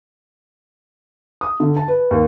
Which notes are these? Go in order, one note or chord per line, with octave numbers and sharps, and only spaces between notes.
D#6
D3
A5
B4
D#2